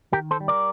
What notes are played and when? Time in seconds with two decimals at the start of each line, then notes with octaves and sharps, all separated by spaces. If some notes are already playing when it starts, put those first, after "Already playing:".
0.13 D#3 G4 A#4
0.31 A4 C5
0.40 G3
0.48 A#4 D5